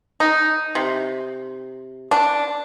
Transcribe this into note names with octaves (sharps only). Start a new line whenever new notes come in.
D#4
C3
D4